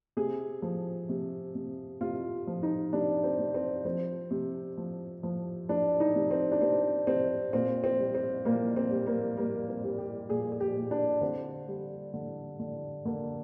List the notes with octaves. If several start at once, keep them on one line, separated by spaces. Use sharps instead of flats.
C3 G#4
F3
C3
C3
C3 F4
F3
D#4
C3 D4
C4
C3
C4
F3 C4
C3
F3
F3
F3 D4
D#4
C3
C4
D4
C3 C4
C3 C4
A#2 C4
C4
G3
C4
A#2 A#3
C4
G3
A#3
G3 A#3
C4
G3
G4
A#2 G#4
G#4
G4
A#2
D4
D3 C4
G3
D3
D3
D3 A#3